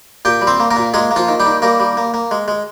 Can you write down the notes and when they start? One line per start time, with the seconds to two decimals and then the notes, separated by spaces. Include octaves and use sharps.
0.25 A#2 G4 G5
0.41 G3
0.47 C4 C5
0.60 A#3
0.71 A#3 A#4
0.76 A#2
0.94 G#3 A#3 G#4
1.11 A#3
1.16 F3 F4
1.28 D#3
1.40 G3 G4
1.46 D#3
1.62 G3 A#3 A#4
1.80 G3
1.97 A#3
2.14 A#3
2.31 G#3
2.48 G#3